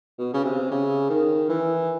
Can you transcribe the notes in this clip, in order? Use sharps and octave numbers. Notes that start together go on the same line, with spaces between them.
B2
C#3
C3
C#3
D#3
E3